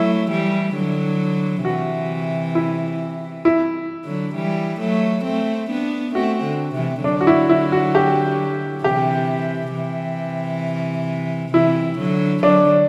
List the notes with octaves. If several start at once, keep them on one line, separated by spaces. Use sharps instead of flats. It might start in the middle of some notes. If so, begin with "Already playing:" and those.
Already playing: F#3 A3 E4
E3 G3
D3 F#3
C3 E3 F#4
E4
E4
D3 F#3
E3 G3
F#3 A3
A3 C4
B3 D4
A3 C4 F#4
D3
C3 E3
D3 F#3 D4
F#4
E4
E4
F#4
G4
C3 E3 G4
C3 E3
C3 E3 E4
D3 F#3
D3 F#3 D4